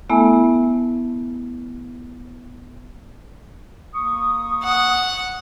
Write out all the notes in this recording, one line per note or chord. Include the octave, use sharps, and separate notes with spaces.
A3 B3 E4 A4 E5 G#5
A#3 C#6 D#6
F#5